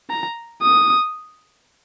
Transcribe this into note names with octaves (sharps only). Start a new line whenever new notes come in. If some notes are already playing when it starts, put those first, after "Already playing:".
A#5
D#6